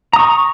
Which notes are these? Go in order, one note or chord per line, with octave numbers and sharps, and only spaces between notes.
A#5 C#6 D#6